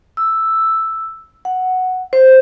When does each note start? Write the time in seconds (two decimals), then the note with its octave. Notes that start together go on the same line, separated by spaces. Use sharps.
0.17 E6
1.45 F#5
2.13 C5